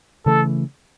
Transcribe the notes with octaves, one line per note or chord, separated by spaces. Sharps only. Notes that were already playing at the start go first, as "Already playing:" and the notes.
C#3 E3 A3 A4